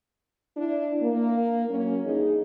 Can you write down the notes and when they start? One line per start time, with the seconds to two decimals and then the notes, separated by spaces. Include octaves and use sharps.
0.57 D4 E4
1.02 A#3
1.69 F#3 A#3 C#4
2.05 G2 E3 D#4 G#4